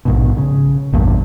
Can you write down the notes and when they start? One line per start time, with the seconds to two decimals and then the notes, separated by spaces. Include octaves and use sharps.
0.05 A#1 G#2 B2
0.37 C#3
0.92 A1 E2 G2 A#2